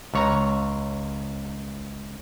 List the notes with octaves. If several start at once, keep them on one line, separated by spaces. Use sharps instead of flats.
C#2 C#5 A#5